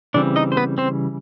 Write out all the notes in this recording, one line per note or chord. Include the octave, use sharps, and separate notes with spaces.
C#3 E3 G3 C4 D4 D5
D#4 D#5
C5
B3 B4
C4 C5